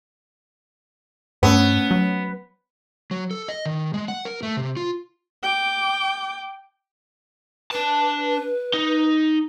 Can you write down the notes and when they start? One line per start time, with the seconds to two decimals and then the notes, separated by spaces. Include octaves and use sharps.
1.43 G2 A3 B3 C#4 C#5
1.91 F#3
3.11 F#3
3.31 A4
3.48 D#5
3.65 D#3
3.94 G#3
4.08 F#5
4.25 A#4
4.43 A3
4.57 C3
4.77 F4
5.43 G5 D6
7.71 D4 B4 A5
8.74 D#4